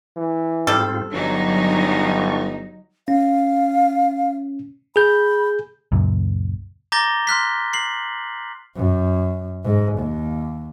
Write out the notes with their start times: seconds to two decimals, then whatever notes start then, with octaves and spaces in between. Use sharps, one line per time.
0.16 E3
0.67 G#2 G3 C4 F4 A4
1.13 G1 F#3 D4 D#4 C#6
3.08 C#4 F5
4.96 G#4 B5 G6
5.92 C#2 F#2 A#2
6.92 A#5 D6 G6 A6 A#6 G7
7.27 C6 F6 F#6 B6
7.73 C7 F#7
8.76 F#2
9.65 G#2
9.99 D#2